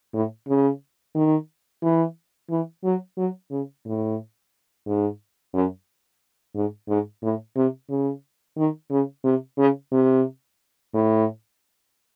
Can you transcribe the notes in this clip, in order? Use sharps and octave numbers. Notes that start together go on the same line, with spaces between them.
A2
C#3
D#3
E3
E3
F#3
F#3
C#3
A2
G#2
F#2
G#2
G#2
A2
C3
C#3
D#3
C#3
C3
C#3
C3
A2